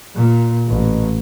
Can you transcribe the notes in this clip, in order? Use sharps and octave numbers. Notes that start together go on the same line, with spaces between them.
A#2
A1